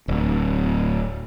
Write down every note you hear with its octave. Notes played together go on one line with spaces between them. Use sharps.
D1